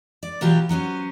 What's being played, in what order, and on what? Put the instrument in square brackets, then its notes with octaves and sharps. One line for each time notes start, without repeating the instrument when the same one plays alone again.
[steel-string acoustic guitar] D5
B2 E3 F#3 F4 G4
F#3 B3 C#4 C5